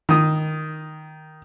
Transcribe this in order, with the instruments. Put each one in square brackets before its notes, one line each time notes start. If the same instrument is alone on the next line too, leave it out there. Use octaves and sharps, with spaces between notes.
[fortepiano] D#3 D#6